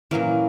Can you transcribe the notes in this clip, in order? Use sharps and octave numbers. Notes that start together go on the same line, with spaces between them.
A#2 E3 F#3 A#3 C#4